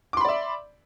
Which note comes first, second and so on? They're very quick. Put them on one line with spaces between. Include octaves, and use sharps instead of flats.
D6 C6 B5 D5 E5